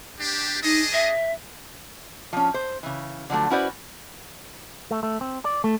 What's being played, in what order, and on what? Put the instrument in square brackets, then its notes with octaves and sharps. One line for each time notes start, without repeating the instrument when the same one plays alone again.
[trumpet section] D4 G4
[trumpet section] D4 G#4 D#5 [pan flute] D#4
[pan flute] E5
[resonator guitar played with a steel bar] F3 C#4
C5
C#3 E3
D3 F3 F#3 A3
C#4 E4 F#4 B4 C5 D5
[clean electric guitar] A3
A3
C4
D5
A3